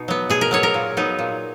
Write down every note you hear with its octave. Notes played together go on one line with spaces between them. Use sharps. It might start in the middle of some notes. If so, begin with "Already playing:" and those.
Already playing: B2 D#4
F#3 B3
B2 G#4
A#4
F#3 B3 C#5
A#4
A#2
F#3 B3 D#4
A#2